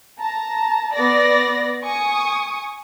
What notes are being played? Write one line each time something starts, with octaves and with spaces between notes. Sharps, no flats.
A5 A#5
B3 D5 A#6
G#5 C#6 D#6